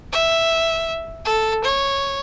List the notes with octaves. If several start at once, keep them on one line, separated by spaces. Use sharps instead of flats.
E5
A4
C#5